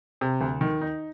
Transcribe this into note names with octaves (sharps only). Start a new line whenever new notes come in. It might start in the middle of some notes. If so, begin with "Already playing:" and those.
C3
D2
D#3
D#4